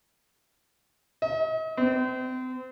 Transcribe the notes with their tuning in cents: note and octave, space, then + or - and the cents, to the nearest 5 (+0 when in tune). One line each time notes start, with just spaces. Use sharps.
D#5 +40
C4 -35